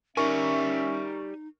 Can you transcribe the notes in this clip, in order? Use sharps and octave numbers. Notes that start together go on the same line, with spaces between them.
C#4 D#4 G4 A#4 D5 E5 G#5 C#6